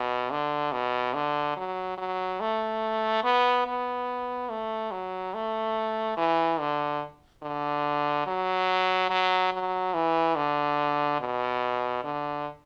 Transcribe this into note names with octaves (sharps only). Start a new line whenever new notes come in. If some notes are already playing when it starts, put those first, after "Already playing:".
Already playing: B2
D3
B2
D3
F#3
F#3
A3
B3
B3
A3
F#3
A3
E3
D3
D3
F#3
F#3
F#3
E3
D3
B2
D3